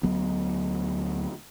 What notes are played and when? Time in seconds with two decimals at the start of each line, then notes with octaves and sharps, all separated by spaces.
0.03 D2 F#3 B3